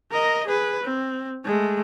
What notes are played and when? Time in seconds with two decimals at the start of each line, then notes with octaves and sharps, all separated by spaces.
0.12 A#4 D#5
0.48 G#4 B4
0.84 C4
1.45 G#3 A3